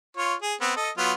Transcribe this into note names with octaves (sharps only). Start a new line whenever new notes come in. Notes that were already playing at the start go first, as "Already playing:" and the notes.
F4 C#5
G#4
B3 C4
A4 D#5
F#3 B3 F4